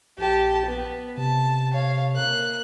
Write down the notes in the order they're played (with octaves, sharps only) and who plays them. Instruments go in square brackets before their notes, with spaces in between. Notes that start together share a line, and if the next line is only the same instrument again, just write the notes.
[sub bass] A#1 [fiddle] G4 A5
[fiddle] B3
[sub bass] C3 [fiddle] A5
[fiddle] C#5 F5
A#3 F#6